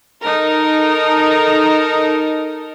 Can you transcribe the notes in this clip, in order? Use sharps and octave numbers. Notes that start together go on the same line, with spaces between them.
D#4 A4 A#4